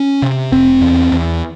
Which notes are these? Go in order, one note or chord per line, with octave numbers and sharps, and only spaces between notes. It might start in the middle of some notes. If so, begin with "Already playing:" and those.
Already playing: C#4
C3
F1 C4
E2
E2